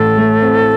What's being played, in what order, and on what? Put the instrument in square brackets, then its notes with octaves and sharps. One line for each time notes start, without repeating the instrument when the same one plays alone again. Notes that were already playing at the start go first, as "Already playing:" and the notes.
Already playing: [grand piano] A1 A2 [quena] A4
[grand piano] A3
C4